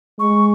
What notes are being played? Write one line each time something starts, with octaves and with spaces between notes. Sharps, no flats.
G#3 C#6